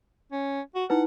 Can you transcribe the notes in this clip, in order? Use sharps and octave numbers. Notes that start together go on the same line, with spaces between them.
C#4
F#4
D#4 E4 B4 F#5